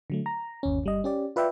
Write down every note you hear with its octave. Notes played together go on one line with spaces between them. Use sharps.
D3 F#3 A3
A#5
G1 D#2 C#4
G1 G3 D#5
C#4 G4 D5
F4 B4 D5 E5 G5